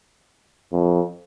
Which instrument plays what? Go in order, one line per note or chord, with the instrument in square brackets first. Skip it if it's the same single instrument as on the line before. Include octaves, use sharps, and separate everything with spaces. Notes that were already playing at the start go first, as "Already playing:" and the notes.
[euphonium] F2